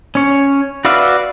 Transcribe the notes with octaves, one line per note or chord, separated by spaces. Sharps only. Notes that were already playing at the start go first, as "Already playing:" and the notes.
C#4 C#5
F#4 B4 D5 E5 F5